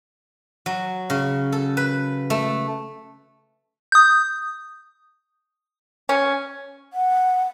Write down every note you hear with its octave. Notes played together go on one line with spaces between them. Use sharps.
F#3
C#3
A4
B4
A3
D#6 G6
C#4
F#5